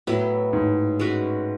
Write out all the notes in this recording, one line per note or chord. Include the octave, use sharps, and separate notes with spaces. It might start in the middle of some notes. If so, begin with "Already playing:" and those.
A2 F#3 B3 E4
G#2
G#3 C#4 F#4 B4